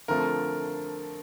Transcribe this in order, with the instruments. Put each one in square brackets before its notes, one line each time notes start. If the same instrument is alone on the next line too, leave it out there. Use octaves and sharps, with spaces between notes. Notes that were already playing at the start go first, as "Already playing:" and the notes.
[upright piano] F2 D3 F3 A3 [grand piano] A#4